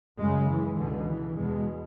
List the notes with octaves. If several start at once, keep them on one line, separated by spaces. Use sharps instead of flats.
F#2 C#3 G#3
E3
C#2 B2 D3
E3
E2 B2 G#3